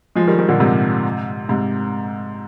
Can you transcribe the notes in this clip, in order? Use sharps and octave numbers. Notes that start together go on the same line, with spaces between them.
F3 G#3
D#3 G3
D#3 G3
A#2 D3
G#2 C3
G#2 C3